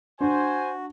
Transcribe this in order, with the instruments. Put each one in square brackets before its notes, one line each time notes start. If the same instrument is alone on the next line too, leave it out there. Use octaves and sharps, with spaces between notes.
[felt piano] D4 [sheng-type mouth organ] F#4 [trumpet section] C5 G#5